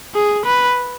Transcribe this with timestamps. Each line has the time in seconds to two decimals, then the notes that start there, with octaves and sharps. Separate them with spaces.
0.15 G#4
0.45 B4